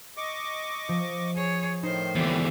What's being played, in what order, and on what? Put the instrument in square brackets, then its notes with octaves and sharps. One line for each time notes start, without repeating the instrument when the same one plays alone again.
[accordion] D#5 C#6 D6
[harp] F3
[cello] G#4 C#5
[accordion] A2 D#3 [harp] D#4 [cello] C5
[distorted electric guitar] E2 D3